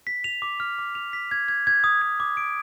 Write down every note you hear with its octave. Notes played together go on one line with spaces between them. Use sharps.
B6
F7
D6
F6
D6
F7
B6
G#6
G#6
G#6
D#6
G#6
D6
D7